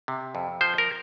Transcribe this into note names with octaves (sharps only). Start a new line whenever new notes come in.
C3
F2
F3 C5
A#4